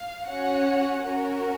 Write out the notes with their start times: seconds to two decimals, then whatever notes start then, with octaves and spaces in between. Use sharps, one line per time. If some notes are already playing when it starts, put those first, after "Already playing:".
Already playing: F5
0.26 C#4 F#4 C#5 F#5
1.04 C#4 F#4 A#4